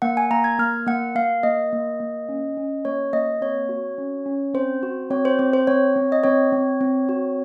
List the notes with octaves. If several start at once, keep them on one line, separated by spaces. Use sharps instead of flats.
A#3 F#5
G#5
A#3 A#5
G#6
A#3 F6
A#3 F#5
A#3 F5
A#3 D#5
A#3
A#3
C#4
C#4
A#3 C#5
A#3 D#5
C4 C#5
F#4
C#4
C#4
C4 C5
F#4
C4 C#5
C5
C4 C5
C5
C4 C#5
C4
D#5
C4 C#5
C4
C4
F#4